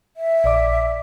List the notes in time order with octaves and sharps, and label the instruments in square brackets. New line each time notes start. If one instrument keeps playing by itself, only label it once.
[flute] E5
[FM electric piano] A#1 D5 D6